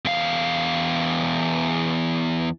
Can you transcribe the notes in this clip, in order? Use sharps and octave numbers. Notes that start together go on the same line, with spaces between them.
E2 F5